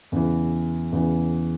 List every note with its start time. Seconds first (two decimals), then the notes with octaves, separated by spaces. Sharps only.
0.12 E2 C#3 E3
0.92 E2 C#3 E3